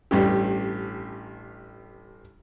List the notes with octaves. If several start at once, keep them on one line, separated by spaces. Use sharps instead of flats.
A1 G2 C#4 G4